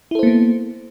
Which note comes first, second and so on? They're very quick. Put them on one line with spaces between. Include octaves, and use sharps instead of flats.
E4 A4 C5 A#3 B3